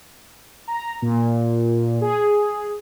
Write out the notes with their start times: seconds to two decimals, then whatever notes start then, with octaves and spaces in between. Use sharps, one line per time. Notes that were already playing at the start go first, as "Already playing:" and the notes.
0.68 A#5
1.02 A#2
2.01 G#4